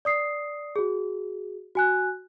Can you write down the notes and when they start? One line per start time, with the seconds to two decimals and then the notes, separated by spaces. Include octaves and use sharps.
0.05 D5 D#6 C7
0.76 F#4 G#4
1.75 F#4 G#5 F#6